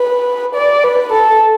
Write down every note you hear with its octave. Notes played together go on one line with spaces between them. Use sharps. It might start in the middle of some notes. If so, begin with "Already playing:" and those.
Already playing: B4
D5
B4
A4